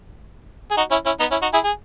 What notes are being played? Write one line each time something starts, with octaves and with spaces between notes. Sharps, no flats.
G#4
D#4 F#4
C#4 E4
C#4 E4
B3 D#4
C#4 E4
D#4 F#4
E4 G#4
G#4